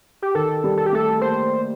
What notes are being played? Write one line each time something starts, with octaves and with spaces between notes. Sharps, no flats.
G4
D#3 A4
G3
A4
G4
A3 A4
A#3 C5